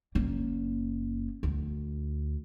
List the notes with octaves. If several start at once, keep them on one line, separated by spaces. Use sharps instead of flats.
F#1 A#3
D2